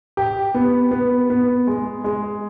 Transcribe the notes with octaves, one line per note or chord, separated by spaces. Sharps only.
G4
B3
B3
B3
G#3
G#3